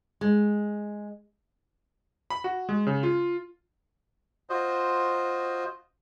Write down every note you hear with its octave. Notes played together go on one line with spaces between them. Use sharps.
G#3
B5
F#4
G#3
C#3
F4
F4 F#4 C5 D#5